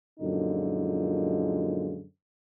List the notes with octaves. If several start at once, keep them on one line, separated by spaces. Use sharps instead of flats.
F#2 A#2 D3 F3 G#3 D#4